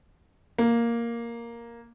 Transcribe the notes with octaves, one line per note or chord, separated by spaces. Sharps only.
A#3